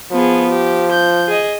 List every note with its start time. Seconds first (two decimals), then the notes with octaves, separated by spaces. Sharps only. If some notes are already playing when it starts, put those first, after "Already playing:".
0.12 F3 B3 G#4
0.51 G4
0.92 G6
1.28 G#4 D#5